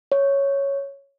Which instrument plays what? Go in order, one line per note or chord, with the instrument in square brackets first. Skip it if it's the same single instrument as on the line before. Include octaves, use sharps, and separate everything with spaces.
[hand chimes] C#5